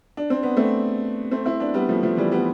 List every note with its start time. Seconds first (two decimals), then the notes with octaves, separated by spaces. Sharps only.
0.17 D4
0.30 C4
0.43 B3
0.57 A3 C4
1.31 A3 C4
1.46 C4 E4
1.60 B3 D4
1.74 G3 B3
1.89 F3 A3
2.03 F3 A3
2.17 E3 G3
2.32 G3 B3